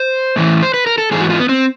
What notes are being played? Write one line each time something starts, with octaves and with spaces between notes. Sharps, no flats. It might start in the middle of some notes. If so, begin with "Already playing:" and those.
Already playing: C5
A2 E3
C5
B4
A#4
A4
G#2 E3 G#4
F#4
F4
B3
C4